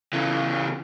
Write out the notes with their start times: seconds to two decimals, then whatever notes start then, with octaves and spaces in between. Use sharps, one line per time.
0.13 C#3 E3